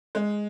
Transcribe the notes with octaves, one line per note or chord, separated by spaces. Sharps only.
G#3